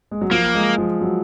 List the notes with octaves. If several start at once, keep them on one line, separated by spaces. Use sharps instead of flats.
G#3
F#3
F3 A#3
G#3
F3
F#3